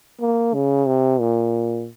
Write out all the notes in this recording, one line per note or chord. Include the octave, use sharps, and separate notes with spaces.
A#3
C#3
C3
A#2